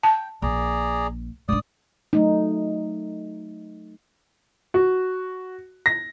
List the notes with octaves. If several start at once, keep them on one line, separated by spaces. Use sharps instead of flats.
G5 A5
A#1 G#4 D5 A#5
G#2 D4 D5 D#6
F#3 A3 D#4
F#4
A#6